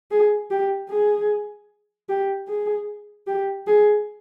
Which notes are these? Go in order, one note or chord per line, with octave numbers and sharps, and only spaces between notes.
G#4
G4
G#4
G4
G#4
G4
G#4